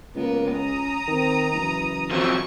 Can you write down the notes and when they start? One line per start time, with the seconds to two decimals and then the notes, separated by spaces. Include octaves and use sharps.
0.15 C#2 A#3 B3 A#4
0.51 C#4 A#5 D#6
1.07 D#3 C4
1.54 F#1 E3
2.11 F3 F#3 C4 C#6